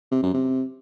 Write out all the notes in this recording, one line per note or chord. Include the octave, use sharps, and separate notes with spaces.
C3
F#2
C3